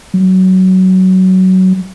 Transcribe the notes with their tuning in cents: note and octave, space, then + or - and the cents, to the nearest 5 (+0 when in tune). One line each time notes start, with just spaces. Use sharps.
F#3 +15